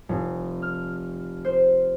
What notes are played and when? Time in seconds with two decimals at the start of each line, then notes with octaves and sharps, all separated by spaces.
0.09 F1
0.62 F6
1.45 C5